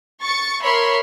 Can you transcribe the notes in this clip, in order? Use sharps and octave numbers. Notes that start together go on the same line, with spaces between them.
C#6 A6 C#7
A#4 C#5 E5 B5 C6